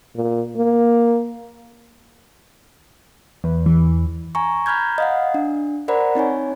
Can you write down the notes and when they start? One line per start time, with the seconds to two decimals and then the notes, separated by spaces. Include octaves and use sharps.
0.16 A#2
0.57 A#3
3.44 E2
3.66 E3
4.35 G#5 A#5 C#6
4.66 A#5 B5 F6 G6 G#6
4.98 D#5 F5 F#5
5.34 D4
5.88 A#4 C5 D5 F#5 A#5 B5
6.15 C4 D#4 C#5 G#5